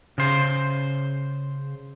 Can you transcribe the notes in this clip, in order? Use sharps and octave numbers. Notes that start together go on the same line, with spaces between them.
C#3 C5